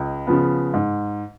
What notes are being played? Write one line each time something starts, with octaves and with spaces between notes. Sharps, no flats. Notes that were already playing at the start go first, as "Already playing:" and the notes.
Already playing: C#2 D#5
C#3 F3 B3
G#2